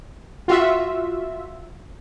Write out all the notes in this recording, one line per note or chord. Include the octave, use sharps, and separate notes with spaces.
F4 F#4 E5